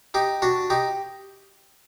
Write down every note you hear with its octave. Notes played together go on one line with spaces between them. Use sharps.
D#4 G4
D4 F#4
D#4 G4